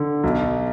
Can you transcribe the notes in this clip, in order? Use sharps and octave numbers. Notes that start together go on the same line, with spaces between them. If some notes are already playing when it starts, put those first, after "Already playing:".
Already playing: D3
B1